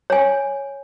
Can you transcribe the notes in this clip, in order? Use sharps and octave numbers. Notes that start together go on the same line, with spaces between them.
C#5 G#5